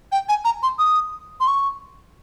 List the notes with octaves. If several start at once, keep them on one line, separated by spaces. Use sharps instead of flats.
G5
G#5
A#5
C6
D#6
C6
C#6